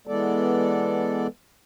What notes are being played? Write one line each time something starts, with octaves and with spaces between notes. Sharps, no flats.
E3 G#3 B3 A4 D5